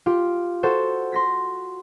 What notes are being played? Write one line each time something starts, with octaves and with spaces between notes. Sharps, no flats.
F4 G4
F#4 A4 C5
C6 A#6 B6